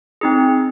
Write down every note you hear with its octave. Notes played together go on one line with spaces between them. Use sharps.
C4 D#4 G#4